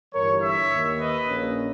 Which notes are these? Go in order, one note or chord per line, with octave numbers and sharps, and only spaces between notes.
G1 G2 E3 G3 A#4 C#5
C#5 E5
D#2 D#3 A#3
B4 D#5
A#1 A#2 A#3 C#4